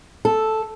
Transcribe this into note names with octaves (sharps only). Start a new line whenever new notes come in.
A4